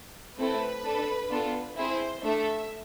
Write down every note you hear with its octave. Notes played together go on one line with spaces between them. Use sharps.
A3 C4 E4 A4 B4
D4 A4
B3 D4 F4 A4
C4 E4 G#4 C5
A3 D4 A4 E5